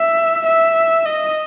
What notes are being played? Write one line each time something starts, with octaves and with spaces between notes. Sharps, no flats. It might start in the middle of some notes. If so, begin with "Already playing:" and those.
Already playing: E5
E5
D#5